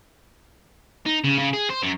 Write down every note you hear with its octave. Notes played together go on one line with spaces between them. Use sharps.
D#4
C#3
C#3
G#4
C5
F#2